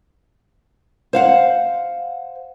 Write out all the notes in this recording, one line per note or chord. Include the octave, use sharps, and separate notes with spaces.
C5 F5 F#5